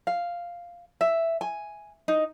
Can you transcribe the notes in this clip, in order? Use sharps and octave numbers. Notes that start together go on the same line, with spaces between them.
F5
E5
G#5
D#4